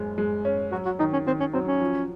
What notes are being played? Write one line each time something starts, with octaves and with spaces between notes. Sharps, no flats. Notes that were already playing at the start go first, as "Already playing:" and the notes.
Already playing: F#1 F#2 G#3
G#3
C#4
F#3 F#4
F#4
D#3 D#4
C#4
D#3 C4
C#4
F#3 C4
C#4
F3